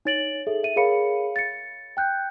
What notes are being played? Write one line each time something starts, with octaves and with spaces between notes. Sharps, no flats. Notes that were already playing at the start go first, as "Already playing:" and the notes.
D#4 C#5 A6 D7 F#7
G#4 A4 E5
E5 D#7
G#4 A#4 C#5 F5 B5 C#7
A6 C#7
G5 F#6 G6